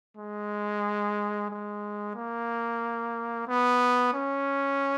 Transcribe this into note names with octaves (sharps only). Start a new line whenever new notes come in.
G#3
G#3
A#3
B3
C#4